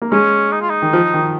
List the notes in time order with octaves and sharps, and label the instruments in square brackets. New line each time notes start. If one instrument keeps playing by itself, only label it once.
[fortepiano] A#3
[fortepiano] G#3 [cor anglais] C#4
[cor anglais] D#4
F4
D#4
[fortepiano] D#3
F3
D#3